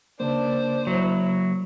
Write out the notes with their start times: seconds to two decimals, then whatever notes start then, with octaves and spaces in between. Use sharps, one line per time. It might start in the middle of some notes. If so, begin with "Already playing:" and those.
0.20 C#3 A#3 D4 C5
0.87 F#3 E4